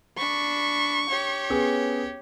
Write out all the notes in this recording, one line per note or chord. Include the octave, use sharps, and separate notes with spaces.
D4 B5 C#6
G4 C#5
B3 C#4 G#4